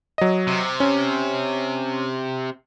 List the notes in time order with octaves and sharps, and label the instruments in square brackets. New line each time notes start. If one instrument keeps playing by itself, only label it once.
[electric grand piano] F#3 D#5
[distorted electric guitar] C3
[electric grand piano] C#4